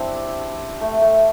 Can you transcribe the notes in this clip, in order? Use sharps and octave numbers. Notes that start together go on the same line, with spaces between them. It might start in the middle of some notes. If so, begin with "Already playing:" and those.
Already playing: C4 D4 E4 G4
A3
A3